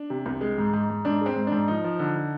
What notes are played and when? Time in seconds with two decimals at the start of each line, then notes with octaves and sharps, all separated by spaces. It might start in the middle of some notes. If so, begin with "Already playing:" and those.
Already playing: D4
0.10 C3
0.26 C2
0.41 G#3
0.58 G#2
0.73 G#2
0.89 G#2
1.05 G#2 D4
1.21 G#3 C4
1.36 G#2
1.47 G#2 D4
1.68 F3 D#4
1.84 F3
1.99 D3
2.16 D3